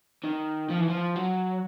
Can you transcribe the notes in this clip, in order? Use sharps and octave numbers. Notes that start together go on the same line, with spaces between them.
D#3
F3
E3
F3
F#3